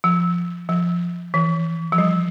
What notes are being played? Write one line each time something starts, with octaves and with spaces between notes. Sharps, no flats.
F3
F3
E3
F3
G3